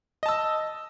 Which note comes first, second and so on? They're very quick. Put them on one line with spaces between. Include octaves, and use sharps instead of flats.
D#5 A5 E6